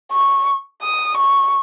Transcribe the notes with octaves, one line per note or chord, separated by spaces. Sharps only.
C#6
D#6
C#6